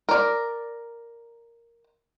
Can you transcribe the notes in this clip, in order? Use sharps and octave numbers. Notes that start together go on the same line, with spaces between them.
A#4 D5